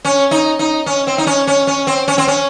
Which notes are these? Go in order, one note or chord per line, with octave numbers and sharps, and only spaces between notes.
C#4
D#4
D#4
C#4
C4
D#4
C#4
C#4
C#4
C4
C#4
C4
C#4